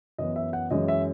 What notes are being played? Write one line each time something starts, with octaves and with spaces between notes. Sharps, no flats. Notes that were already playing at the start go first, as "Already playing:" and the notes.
F#2 E3 B3 D#5
E5
F#5
F#2 E3 G#3 C#4 D#5
E5